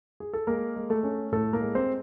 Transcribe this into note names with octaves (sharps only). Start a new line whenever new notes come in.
G#4
A4
G#3 A#3 A#4
G#3
A3 A4
C#4
A2 A3 A4
A#3 A#4
G#3
C4 C5